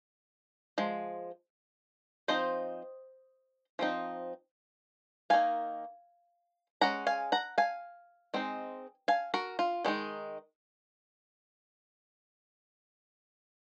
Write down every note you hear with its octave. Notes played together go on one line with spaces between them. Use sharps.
F3 G#3
F3 C4 D#4 C5 D#5
F3 C4 D#4
D#3 A#3 D#4 F5 G#5
G#3 C#4 F#5 A#5
F5 G#5
F#5 A#5
F5 G#5
G#3 C4 D#4
F5 G#5
F#4 A#4
F4
D#3 G#3 D#4